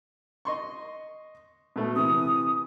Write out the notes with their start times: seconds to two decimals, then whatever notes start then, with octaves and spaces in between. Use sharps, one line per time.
0.45 D#5 C6 C#6
1.76 B2 A3
1.96 C3 E3 D#6